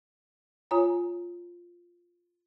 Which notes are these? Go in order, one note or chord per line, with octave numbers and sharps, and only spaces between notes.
F4 C#5 G#5 A#5